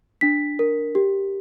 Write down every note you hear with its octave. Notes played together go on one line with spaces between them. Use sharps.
D4 B6
A#4
G4